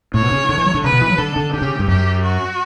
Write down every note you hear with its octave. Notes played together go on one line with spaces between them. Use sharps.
A2 C#5
B2
C#3
D3
E3
F#3
D3
C#3 B4
B2
E3
F#3
D3 A4
D3
D3 G4
C#3
G2
F#2 G4
F#4